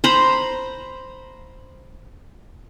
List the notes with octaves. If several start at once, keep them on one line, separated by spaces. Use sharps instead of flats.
C5 A#5 B5